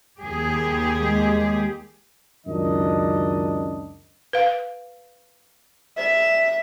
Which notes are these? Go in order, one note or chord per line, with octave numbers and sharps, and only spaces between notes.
D#2 G4 G#4
G#3
C#2 F#2 D#3 D4 D#5
B4 F5
C5 E5